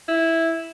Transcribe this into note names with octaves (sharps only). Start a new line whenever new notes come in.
E4